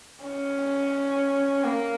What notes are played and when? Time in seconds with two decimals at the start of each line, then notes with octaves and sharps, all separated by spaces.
0.24 C#4
1.64 A#3